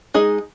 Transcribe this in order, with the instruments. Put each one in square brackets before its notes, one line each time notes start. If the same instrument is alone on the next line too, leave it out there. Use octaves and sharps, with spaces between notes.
[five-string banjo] G#3 D#4 G#4 D#5